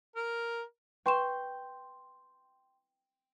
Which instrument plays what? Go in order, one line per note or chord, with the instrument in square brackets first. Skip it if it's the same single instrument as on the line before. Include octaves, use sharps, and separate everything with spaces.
[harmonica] A#4
[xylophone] B4 C#6 E7 [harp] G5 C6